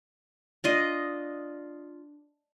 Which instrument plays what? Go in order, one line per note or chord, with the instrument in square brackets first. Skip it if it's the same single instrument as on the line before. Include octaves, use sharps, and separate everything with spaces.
[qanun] D4 F4 D#5